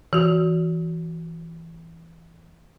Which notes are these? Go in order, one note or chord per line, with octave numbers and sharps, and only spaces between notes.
E3 F#4